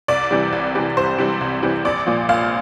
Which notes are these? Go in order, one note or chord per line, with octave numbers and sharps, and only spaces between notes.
C2 D5
C3 E3 G3
C2
C3 E3 G3
C2 C5
C3 E3 G3
C2
C3 E3 G3
A#1 D5
A#2 F3
A#1 F5